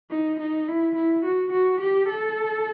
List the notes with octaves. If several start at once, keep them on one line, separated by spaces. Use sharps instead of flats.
D#4
D#4
E4
E4
F#4
F#4
G4
A4